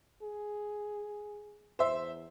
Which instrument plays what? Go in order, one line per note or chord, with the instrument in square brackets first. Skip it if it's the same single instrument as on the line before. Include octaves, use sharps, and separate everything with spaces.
[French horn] G#4
[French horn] E2 [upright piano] C5 E5